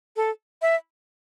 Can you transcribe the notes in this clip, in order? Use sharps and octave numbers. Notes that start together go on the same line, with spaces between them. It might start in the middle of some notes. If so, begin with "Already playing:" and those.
A4
E5